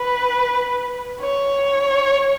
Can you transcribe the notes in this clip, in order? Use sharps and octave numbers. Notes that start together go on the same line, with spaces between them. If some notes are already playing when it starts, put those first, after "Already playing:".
Already playing: B4
C#5